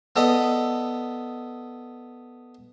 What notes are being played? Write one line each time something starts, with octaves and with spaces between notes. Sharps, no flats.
B3 A4 D5 D#5 B5